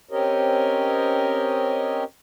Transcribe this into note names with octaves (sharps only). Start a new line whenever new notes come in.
C4 C#4 G4 A#4 C#5 D#5